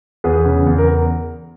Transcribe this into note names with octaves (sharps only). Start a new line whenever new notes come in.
E2 G#4 B4
C#3
E2
A#4